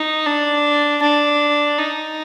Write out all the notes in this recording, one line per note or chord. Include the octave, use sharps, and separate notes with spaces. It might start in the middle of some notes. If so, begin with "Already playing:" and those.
Already playing: D#4
D4
D4
D#4